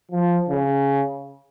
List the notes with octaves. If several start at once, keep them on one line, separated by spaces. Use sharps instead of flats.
F3
C#3